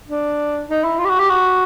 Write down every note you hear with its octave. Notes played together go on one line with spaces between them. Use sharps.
D4
D#4
E4
F4
G4
F#4
G4
F#4